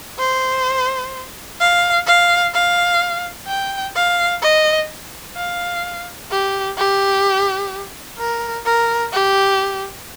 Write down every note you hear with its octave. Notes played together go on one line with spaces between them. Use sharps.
C5
F5
F5
F5
G5
F5
D#5
F5
G4
G4
A#4
A#4
G4